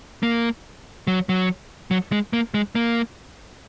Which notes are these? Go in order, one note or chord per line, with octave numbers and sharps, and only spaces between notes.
A#3
F#3
F#3
F#3
G#3
A#3
G#3
A#3